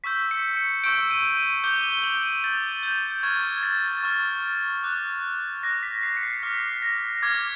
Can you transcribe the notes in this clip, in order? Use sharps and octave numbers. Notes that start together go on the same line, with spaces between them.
C#6 E6 G6 B6
C#7
C#7
C#6 E6 G6 D7
D#7
D#7
D6 G6 G7
G7
F#7
D#7
D6 G6 A6
G6
C#6 F6 G#6
A6
C#6 F6
D6 F#6
D6 F#6 A#6
B6
C7
C#7
C7
D6 F6 B6
A#6
D6 F6 G#6